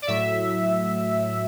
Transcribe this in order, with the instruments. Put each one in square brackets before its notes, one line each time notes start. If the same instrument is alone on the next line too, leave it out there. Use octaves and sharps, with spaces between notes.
[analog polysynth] D5
A2 F#3 E5